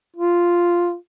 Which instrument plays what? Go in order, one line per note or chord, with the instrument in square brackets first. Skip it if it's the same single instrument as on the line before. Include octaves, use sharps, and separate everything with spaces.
[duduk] F4